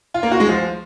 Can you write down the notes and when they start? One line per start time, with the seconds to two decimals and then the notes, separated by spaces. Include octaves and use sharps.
0.14 F4
0.23 A#3
0.31 F#4
0.40 G#3
0.48 F3